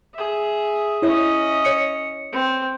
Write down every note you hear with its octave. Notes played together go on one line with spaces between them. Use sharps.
G#4 E5
C#4 E4 C#5 D#5 E5
C#5 C#7
C4